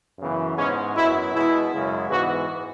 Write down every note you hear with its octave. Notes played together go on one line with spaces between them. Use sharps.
F#2 C#3 E3 B3
G#2 G#3 B3 C#4
F#2 F#3 B3 E4
B2 G#3 B3 E4
F#2 C#3 G#3
G#2 E3 B3 F#4